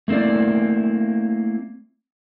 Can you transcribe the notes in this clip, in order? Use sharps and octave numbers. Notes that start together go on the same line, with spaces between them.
A3 A#3 C4 E4 D5